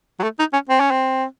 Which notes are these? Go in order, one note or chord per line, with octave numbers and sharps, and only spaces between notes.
F#3
A3
D#4
C#4
C4
C#4
C4